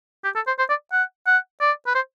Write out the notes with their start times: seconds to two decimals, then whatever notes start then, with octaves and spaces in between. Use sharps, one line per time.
0.24 G4
0.35 A4
0.47 C5
0.59 C5
0.69 D5
0.92 F#5
1.27 F#5
1.61 D5
1.87 B4
1.95 C5